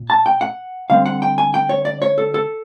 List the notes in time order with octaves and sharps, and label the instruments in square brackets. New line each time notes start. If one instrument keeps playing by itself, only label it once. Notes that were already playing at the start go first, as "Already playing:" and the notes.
Already playing: [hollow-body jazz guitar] A#2
A5
G5
F#5
D3 G3 C4 F5
F#5
G5
G#5
G5
C#5
D5
C#5
A4
A4